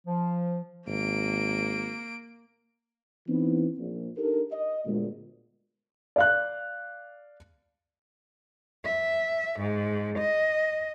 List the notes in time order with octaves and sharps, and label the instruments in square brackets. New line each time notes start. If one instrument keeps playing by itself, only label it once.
[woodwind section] F3
[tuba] G#1 [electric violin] A#3 D7
[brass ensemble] E3 B3 C4 D#4
A#1
D4 D#4 G4 A4 A#4
D#5
G1 D2 A#2 G#3
[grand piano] D5 F5 F#6
[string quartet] E5
G#2
D#5